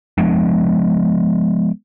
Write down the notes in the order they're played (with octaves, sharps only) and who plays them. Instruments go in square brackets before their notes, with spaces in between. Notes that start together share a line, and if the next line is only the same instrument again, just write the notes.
[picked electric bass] F3 G#3 B3 D4